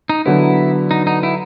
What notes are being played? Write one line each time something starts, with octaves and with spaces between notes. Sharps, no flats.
D#4
D3 F#3 B3 E4
D#4
D#4
E4